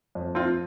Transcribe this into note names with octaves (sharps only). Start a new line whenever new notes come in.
F2
C4 F4